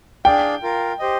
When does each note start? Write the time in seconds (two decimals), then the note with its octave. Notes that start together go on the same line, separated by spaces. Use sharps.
0.25 D4 G#4 D5 F5 G5
0.63 F4 A#4 F5
0.99 G4 C5 D#5